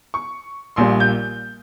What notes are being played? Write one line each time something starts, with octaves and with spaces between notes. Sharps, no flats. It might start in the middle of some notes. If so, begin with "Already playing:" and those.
C#6
A#1 A#2 G3 C6
G6